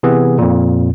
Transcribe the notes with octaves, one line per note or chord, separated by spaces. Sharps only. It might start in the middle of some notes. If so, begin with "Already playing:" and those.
C3 E3 B3 G#4
F2 A#2